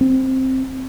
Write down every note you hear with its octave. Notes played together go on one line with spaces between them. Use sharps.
C4